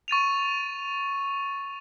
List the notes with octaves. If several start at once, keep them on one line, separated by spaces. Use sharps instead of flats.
C#6 A6 D#7 F7